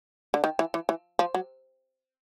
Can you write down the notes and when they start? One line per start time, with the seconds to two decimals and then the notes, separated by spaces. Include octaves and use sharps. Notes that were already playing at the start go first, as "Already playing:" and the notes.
0.34 D3
0.44 D#3
0.59 E3
0.74 E3
0.89 E3
1.19 F3
1.34 F#3